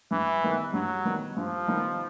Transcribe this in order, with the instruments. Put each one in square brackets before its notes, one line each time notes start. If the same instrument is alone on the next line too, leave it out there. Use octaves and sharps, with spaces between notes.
[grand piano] G2 [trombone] E3
[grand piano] D#3 G3 B3 D#4
[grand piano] G2 [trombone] F#3
[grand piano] D#3 G3 B3 D#4
[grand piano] G2 [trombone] F3
[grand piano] D#3 G3 B3 D#4